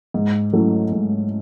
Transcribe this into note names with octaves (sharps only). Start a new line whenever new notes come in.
G#2
F#3 A3 C#4 E4
G#2